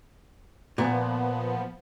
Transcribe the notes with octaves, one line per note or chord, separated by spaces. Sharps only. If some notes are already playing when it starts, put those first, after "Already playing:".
A#2 F3 B3